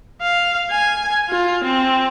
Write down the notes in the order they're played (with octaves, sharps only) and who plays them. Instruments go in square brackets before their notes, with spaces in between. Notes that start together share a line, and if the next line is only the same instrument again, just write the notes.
[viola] F5
G#5
F4
C4